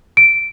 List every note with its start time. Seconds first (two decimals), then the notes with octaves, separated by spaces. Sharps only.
0.17 D7